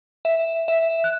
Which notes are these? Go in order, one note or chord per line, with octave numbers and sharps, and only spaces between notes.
E5
E5
F#6